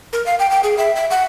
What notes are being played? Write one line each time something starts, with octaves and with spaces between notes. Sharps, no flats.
A#4
F5
G5
G5
G#4
E5
E5
F#5